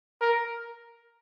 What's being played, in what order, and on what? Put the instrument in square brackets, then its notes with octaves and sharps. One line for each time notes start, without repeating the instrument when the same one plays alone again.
[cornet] A#4